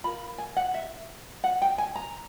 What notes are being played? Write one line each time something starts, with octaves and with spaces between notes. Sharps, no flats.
F4 A#4 B5
G#5
F#5
E5
F#5
G5
G#5
A#5